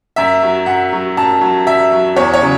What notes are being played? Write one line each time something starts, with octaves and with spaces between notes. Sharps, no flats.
F#2 E5
F#3
F#2 F#5
F#3
F#2 A5
F#3
F#2 E5
F#3
E2 C#5
C#5
C#3 F#3